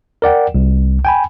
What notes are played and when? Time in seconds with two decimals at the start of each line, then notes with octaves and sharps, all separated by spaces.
0.22 A#4 D5 F#5 G5
0.55 C2
1.05 G5 G#5 B5